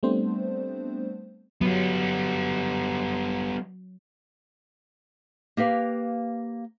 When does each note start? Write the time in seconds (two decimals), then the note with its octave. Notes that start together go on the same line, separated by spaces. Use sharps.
0.03 G3 A3 B3 C4 D4 C5
1.61 F#3 G3 B3
5.57 A#3 G4 B4 F5